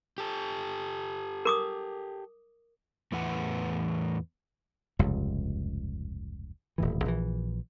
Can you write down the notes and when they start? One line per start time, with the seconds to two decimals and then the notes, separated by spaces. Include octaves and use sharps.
0.18 G4 A4
1.45 A#4 D6 D#6
3.12 E2 A2 E3 B4 F#5
4.99 F1 C#2 G2
6.78 D#1 A2 E3
7.05 A#1 E3